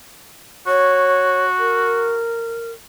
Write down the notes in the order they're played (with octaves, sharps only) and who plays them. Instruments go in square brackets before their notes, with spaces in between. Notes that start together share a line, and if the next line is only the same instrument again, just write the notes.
[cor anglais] F#4 [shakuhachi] C#5
[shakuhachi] A#4